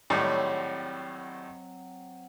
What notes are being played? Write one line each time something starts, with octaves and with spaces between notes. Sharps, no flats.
G#1 A2 F#3 G3 C4 F#5